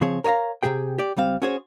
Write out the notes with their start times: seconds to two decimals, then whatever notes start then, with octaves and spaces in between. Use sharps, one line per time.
0.01 C#3 F3 C4 G#4 C#5
0.24 A#4 C#5 D#5 F5 A#5
0.63 C3 D#3 G4 G#4 G5
0.98 G4 D5
1.16 C#2 G3 C4 F5
1.42 C#4 F#4 G#4 C5 C#5